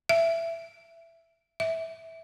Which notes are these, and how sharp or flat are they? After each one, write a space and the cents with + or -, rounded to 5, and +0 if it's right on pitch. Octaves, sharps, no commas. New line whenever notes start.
E5 +15
E5 -10